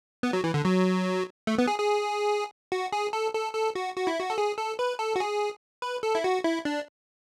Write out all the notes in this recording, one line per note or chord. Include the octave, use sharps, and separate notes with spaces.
B3
F#3
E3
D3
F#3
A3
B3
G#4
G#4
F#4
G#4
A4
A4
A4
F#4
F#4
E4
F#4
A4
G#4
A4
B4
A4
F#4
G#4
B4
A4
E4
F#4
E4
D4